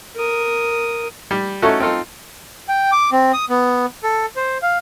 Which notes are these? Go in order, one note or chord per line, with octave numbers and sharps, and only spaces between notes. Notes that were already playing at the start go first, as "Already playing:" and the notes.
A#4 D#6
G3
A3 C#4 D#4 E4 F#4 A4
C4 D#4 F4 A4
G5
D6
C4
D#6
B3
A4
C5
F5